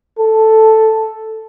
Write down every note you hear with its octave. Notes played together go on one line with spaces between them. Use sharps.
A4